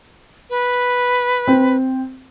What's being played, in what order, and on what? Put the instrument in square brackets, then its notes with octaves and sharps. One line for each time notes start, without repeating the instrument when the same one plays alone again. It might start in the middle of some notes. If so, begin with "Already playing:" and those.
[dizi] B4
[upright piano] C4